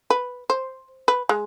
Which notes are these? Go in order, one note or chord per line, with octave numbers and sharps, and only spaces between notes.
B4
C5
B4
G#3